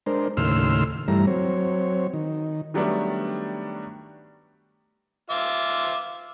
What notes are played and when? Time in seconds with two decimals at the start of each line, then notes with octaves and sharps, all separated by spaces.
0.06 G#3 D4 A#4 C5
0.37 D#2 A2 C#3 C6 E6 F6
1.08 G2 E3 G3 A3 A#5
1.27 F#3 C4 C#5
2.14 D#3
2.74 D#3 F#3 G3 A3 B3 D4
5.30 F4 E5 D6